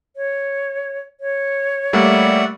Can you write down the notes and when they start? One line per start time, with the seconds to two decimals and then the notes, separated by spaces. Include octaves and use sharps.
0.16 C#5
1.20 C#5
1.93 G3 A3 A#3 D5 E5 F#5